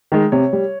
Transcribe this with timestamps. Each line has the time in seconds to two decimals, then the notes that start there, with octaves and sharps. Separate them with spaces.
0.12 D#3 G#3
0.32 C3 C#5
0.53 G3